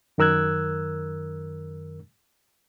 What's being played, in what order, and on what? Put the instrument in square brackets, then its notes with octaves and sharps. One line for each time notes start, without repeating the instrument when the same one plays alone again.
[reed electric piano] F#2 D#3 A#4 E6 F#6 G#6